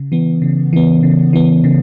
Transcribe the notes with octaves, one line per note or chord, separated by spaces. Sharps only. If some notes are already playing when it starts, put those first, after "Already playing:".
Already playing: C#3
E3 B3
C#3
E3 B3
C#3
E3 B3
C#3